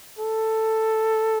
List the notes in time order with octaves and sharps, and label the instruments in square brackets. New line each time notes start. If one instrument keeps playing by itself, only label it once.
[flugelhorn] A4